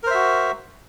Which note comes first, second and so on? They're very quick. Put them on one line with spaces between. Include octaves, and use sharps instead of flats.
A#4 C5 E5 F#4